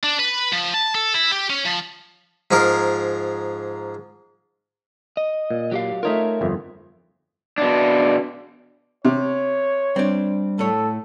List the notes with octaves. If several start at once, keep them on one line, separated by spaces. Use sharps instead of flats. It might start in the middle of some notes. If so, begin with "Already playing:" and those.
D4
B4
F3
A5
A4
E4
G4
C#4
F3
G#2 F3 G#4 A#4
D#5
A#2
F#3 G4 F5
A3 D#4 F4 A#4 C#5 E5
G1 F2
B2 D4
C3 C#5
G3 C4 D4
A2 A4 C#5